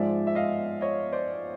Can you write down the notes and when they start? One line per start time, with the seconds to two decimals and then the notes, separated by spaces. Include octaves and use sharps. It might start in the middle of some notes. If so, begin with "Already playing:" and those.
Already playing: G#2 F3 G#3 D5 E5
0.27 E5
0.35 D#5 F5
0.81 C#5 D#5
1.13 C5 D5